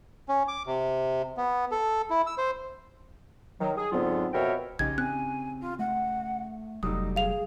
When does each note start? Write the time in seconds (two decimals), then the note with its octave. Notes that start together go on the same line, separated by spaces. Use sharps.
0.29 C#4
0.48 D6
0.67 C3
1.37 B3
1.72 A4
2.10 E4
2.27 E6
2.38 C5
3.60 D#3 F#3
3.77 G#4
3.92 G#2 D3 F#3 B3 C4 F4
4.33 F2 B2 A#4 C#5 E5 G5
4.79 A#1 C#3 D#4 G4 G#6
4.98 C4 G#5 F#6
5.60 F4
5.79 A3 F#5
6.83 F1 F#3 G3 A3 D#4 D#6
7.16 G#4 F5 F7